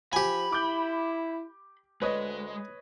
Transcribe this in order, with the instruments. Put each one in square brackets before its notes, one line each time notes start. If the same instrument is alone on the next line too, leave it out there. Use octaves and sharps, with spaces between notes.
[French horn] F3 [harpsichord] G4 G#5 [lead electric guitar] B5
[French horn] E4 [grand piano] D6 G6
[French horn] D2 [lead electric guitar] G#3 [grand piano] B4 C#5 D#5